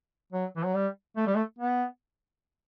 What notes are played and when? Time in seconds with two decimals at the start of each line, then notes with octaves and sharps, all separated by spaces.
0.33 F#3
0.56 E3
0.65 F#3
0.75 G3
1.17 A3
1.26 G3
1.35 A3
1.59 B3